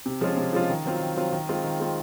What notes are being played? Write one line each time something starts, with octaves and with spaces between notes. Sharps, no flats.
C3
F3 G#3 C#4 F4
C3
F3 G#3 C#4 F4
D#3
F#3 C4 F4
D#3
F#3 C4 F4
D#3
G#3 C4 F4
D#3
G#3 C4 F4